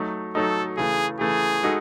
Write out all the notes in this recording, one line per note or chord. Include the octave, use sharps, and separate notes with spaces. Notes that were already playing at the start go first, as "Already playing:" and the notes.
Already playing: F#3 A3 D#4
F#3 A3 D#4 A4
C#3 E3 A3 G#4
C#3 E3 A3 G#4
G#3 D#4 F#4 A4